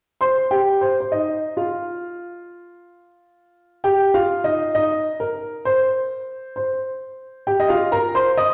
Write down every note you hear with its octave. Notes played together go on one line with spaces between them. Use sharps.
C5 C6
G4 G5
C5
C5
D#4 D#5
F4 F5
G4 G5
F4 F5
D#4 D#5
D#4 D#5
A#4
C5
C5
G4 G5
D#5
F4 F5
A#4 A#5
C5 C6
D#5 D#6